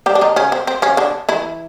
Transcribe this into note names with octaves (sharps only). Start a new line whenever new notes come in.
G3 G4
D4
D#3 D#4
C#3 C#4
C4
C4
C#3 C#4
D3 D4
E3 E4